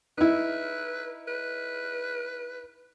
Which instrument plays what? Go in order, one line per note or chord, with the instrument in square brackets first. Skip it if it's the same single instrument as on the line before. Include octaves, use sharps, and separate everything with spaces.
[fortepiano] D#4 E4 [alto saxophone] B4
[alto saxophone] B4